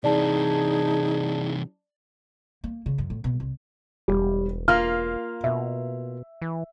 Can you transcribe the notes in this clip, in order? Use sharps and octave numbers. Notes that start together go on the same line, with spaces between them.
C3 E3 D#4 G#4 D5 A5
A#3
C#3
F#2
A2
B2
C2
E1 G3
A#3 F4 F6
B2 E5
E3